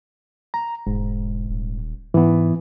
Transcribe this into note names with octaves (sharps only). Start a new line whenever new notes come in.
A#5
E1 G#2
D#1
G#2 E3 B3